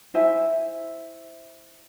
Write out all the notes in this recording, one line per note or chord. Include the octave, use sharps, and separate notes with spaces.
E4 C5 E5 G#5